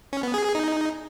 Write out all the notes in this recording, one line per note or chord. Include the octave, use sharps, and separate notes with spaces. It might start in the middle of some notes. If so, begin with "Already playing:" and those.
C#4
B3
G#4
G#4
D#4